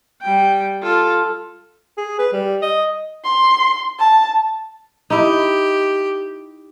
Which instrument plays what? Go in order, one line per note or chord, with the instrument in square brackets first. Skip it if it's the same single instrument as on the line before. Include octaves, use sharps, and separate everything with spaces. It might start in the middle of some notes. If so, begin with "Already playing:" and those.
[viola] G3 G5
F4 A4
[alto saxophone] G#4
B4
G3
D#5
[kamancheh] C6
A5
[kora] D#4 E4 [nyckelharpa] G4